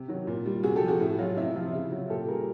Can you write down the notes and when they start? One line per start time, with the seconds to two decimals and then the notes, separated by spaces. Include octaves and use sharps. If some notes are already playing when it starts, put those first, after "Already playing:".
Already playing: C3 G4
0.08 D#3 F#3
0.27 A#2
0.46 G3
0.63 C3 F#4 G#4
0.76 G4 A4
0.81 F3
0.88 F#4 G#4
1.00 A2
1.18 F#3 F4
1.37 C3 E4
1.56 F3 F4
1.73 C#3 E4
1.92 F#3
2.10 A#2 G4 A4
2.28 G3 G#4 A#4